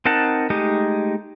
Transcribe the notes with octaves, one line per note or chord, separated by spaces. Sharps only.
C4 D#4 A#4 F#5 A5
G#3 A3 D#4 G4 D#5